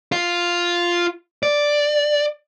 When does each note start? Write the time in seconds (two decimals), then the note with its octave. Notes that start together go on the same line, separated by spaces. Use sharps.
0.12 F4 F5
1.43 D5